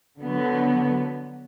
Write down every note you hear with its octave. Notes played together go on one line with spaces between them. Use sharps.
D3 F#3 B3